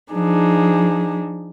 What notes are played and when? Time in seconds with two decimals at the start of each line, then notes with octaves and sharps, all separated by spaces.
0.12 F3 D4 D#4 G#4